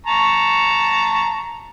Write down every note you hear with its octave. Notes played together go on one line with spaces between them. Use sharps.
A5 A#5 C#6